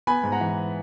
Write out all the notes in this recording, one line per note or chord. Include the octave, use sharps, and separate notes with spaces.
B3 G#5 B5
G#2
F#5 A#5
E3